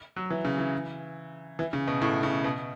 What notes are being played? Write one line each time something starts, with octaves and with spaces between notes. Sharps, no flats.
F#3
E3
C#3
E3
E3
C#3
B2
A2
C#3
B2